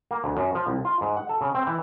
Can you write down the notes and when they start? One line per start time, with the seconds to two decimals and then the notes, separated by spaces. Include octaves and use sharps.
0.11 A#3
0.24 D2
0.37 F#2
0.55 F3
0.67 C2
0.85 F4
1.01 G#2
1.17 F#5
1.29 A4
1.41 C#3
1.55 C4
1.67 E3